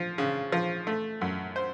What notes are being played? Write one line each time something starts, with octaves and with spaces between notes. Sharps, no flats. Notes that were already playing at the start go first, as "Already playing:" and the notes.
Already playing: F3
C#3
F3
A3
F#2
C5